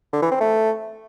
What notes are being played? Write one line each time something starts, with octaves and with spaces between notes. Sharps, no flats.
D3
E3
C4
A3